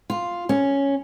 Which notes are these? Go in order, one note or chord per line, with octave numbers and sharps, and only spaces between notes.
F4
C#4